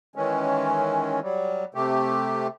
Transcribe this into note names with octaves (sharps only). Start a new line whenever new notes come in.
D#3 E3 G#3 C#4
F#3 G3
C3 A3 G4